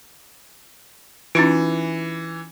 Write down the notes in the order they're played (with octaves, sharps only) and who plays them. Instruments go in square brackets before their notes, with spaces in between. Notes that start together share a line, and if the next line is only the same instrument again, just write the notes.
[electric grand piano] E3 [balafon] C#4 D#4 F4